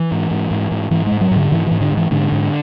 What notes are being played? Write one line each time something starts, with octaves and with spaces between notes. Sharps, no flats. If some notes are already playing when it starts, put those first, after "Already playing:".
Already playing: E3
G#2
G#2
G#2
G#2
G#2 E3
G#2 G#3
F#3
G#2
D3
G#2 E3
G#2 E3
D3
G#2
E3
G#2 D3
G#2